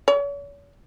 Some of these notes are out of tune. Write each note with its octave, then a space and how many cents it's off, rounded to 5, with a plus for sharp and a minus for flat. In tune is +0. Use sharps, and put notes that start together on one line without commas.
C#5 +40